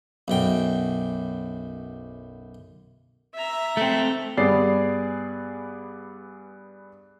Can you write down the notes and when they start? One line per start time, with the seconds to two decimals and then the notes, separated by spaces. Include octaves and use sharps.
0.28 B1 F#2 G5
3.35 E5 A#5
3.77 A3 C4
4.37 G2 B3 G#4 D5 C7